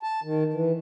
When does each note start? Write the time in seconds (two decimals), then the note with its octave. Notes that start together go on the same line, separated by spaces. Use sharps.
0.03 A5
0.24 D#3
0.54 E3